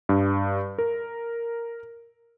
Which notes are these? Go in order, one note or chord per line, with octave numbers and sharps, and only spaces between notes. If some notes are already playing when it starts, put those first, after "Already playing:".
G2
A#4